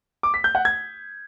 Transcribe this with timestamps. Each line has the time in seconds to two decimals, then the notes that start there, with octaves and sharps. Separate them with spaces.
0.23 D6
0.34 B6
0.44 G6
0.55 F#5
0.65 G#6